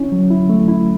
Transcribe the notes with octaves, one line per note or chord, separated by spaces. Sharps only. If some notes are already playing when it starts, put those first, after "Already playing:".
Already playing: C#4 E4
F#3
E4
A3
E4